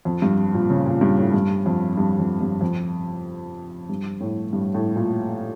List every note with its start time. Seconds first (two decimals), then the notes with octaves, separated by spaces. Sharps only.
0.05 F2
0.22 G2
0.54 A#2
0.70 C#3
0.86 A#2
1.01 G2
1.18 A2
1.34 G2
1.66 F2
1.97 G2
2.19 F2
2.41 G2
2.61 F2
3.89 G2
4.21 A2
4.53 G2
4.74 A2
4.96 A#2